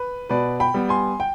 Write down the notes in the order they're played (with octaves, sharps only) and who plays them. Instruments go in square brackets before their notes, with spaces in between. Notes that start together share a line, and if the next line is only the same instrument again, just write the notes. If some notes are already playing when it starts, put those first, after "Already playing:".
Already playing: [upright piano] B4
B2 B4 D5
G5 B5
G3 B3
G#5 C6
G5